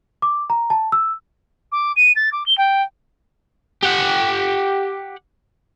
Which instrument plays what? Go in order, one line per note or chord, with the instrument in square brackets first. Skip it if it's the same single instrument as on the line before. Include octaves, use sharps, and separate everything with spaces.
[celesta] D6
A#5
A5
E6
[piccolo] D6
D#7
A6
D6
G7
G5
[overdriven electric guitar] G4 F#5